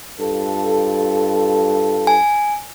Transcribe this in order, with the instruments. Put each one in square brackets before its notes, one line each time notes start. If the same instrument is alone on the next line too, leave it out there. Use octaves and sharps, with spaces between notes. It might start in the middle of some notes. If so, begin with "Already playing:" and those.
[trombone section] G2 F4 A4
[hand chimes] G#5